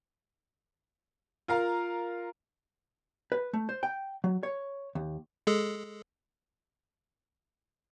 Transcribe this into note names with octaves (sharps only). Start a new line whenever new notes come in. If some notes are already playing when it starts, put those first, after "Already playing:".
F4 A#4 F5 A#5
B4
A3
C5
G5
F#3
C#5
D#2
G#3 G#4 A4